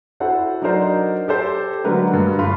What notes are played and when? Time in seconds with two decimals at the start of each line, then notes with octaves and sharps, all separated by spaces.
0.20 E4 F#4 A4 C5 F#5
0.62 F#3 D4 D#4 A#4 C5 D5
1.28 G4 A4 C5
1.84 D3 F#3 G#3 D4 A#4 B4
2.13 G2
2.38 G1 F4 B5